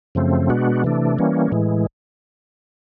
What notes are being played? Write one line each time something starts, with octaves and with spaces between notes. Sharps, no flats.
F#2 C#3 F3 A3 C4
B2 G#3 B3 D4 F#4
C3 E3 A3 D4
E3 G3 A#3 C#4
A2 E3 G#3